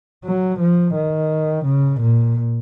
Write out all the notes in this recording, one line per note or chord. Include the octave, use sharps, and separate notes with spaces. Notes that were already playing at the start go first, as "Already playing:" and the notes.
F#3
F3
D#3
C#3
A#2